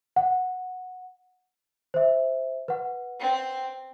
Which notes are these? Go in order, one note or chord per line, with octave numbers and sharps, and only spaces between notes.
F#5
C5 E5
B4 F#5
C4